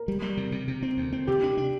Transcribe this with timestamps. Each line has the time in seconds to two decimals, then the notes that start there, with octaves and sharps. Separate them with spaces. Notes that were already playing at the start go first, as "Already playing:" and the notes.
Already playing: A#4
0.08 G3
0.22 G3
0.37 C3
0.52 C3
0.68 C3
0.83 C4
0.97 D2
1.13 C4
1.27 C3 G4
1.43 D4
1.57 D4